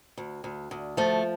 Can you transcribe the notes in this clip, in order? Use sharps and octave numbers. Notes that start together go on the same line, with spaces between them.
D2
D2
D2
F3 A3